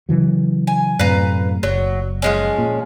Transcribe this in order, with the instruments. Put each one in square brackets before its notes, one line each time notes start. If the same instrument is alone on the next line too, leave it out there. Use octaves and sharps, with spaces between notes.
[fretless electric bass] C#3 E3 F#3
[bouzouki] G#5
[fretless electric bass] F#2 A2 C3 [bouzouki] B4 F5 A#5
[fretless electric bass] F#1 [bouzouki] F#3
[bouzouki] F3 G#3 C#4
[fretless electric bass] A#2